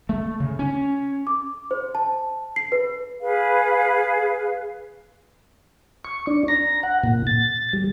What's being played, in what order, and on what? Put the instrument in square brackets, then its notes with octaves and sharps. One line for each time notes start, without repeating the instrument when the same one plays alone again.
[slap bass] A3
C#3
C#4
[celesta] D6
C5
A5
C7
B4
[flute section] G#4 B4 F5
[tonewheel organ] C#6
D4
A#5
F#5
A#2
A6
G3